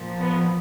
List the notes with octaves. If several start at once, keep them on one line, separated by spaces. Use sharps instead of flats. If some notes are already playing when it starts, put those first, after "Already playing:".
Already playing: A#2 F3
B3